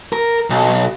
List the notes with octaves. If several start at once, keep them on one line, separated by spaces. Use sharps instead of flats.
A#4
B1